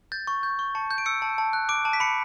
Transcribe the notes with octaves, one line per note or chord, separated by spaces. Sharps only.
G6 A6
C#6
G6
C#6
A5 C#7
G6
D7
E6 C#7
A5
A5
F#6
D6 D7
A5
B6
B5 C#7